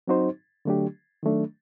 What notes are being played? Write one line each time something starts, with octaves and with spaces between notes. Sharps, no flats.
F#3 C4 D#4 F#4 C5
D3 F#3 A3 D4 G4
D#3 F#3 A3 D4